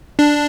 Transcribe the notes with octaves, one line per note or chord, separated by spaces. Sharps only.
D4